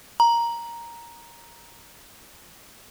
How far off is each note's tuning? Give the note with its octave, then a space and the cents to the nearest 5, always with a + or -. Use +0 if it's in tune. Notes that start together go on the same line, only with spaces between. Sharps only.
A#5 +5